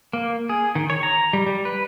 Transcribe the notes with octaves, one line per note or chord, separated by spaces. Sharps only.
A#3
G#4
D#3
C#5
A#5
G3
G3
B4